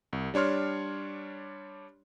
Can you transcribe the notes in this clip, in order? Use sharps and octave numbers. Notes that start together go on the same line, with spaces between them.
C2
G3 D4 C#5 C6 F6